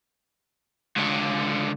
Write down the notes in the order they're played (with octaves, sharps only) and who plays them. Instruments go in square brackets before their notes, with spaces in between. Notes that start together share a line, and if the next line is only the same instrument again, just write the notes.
[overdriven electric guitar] C#2 D3